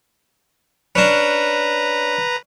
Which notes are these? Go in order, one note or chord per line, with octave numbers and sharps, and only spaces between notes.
C#4 D4 B4 A#5